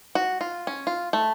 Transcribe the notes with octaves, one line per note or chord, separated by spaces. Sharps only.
F#4
F4
C#4
F4
A3